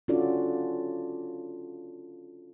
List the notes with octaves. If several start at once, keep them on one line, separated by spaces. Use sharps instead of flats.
C#4 D4 F4 F#4 A4 D5